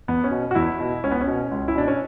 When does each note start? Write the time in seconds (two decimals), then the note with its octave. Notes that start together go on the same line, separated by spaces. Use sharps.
0.08 E2 B3
0.24 C#4
0.31 B2
0.51 F#4
0.55 E2 E4
0.80 B2
1.03 C#2 C#4
1.11 B3
1.21 C#4
1.27 B2
1.51 C#2
1.68 E4
1.75 B2 D4
1.88 C#4